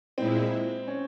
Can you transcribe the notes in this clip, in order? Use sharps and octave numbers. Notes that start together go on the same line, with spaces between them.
A#2 G#3 C4 E4
C#4